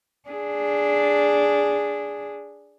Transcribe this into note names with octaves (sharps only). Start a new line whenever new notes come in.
D4 G#4